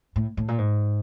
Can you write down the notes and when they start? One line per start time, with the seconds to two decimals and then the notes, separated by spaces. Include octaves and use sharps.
0.16 A2
0.37 A2
0.48 A#2
0.58 G#2